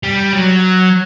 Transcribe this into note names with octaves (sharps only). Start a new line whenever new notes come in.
G3
F#3